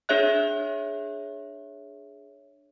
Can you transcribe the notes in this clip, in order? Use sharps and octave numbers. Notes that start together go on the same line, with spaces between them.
D4 G#4 C#5 E5 F#6